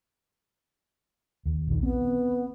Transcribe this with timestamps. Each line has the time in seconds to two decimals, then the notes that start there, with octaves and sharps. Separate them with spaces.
1.46 D#2
1.67 A#1 D#3
1.83 B3 C4